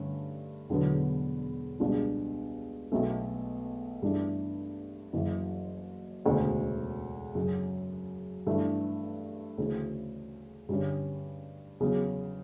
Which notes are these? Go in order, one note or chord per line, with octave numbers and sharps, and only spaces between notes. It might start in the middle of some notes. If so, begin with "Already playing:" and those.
Already playing: G2 D3 A3 C#4
E1 E2 D3 F#3 B3
C#2 B2 G3 D4
B1 B2 A3
G2 E3 A3 D4
F#1 F#2 E3
E1 D2 C#3
F#2 C#3 F#3
G2 E3 A3 D4
D2 C#3 E3
G2 D3 G3 C#4
E2 C#3 F#3